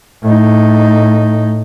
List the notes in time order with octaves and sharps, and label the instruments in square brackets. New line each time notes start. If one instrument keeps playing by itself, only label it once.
[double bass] A2 D#4